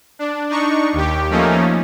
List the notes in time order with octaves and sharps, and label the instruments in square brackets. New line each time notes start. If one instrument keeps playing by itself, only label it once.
[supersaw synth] D4
D4 D#4 C#6
D#2 G4
F3 A3 A#3 C#4 D#4